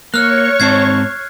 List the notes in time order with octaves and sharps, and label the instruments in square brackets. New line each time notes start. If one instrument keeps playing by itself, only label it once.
[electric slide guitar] A#3 [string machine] C#5 C#6 [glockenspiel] F6 F#6
[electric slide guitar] G#2 C4 A5 [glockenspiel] G#6 C7